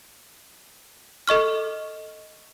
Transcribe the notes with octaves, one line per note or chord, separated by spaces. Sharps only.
A4 D#5 C#6 F6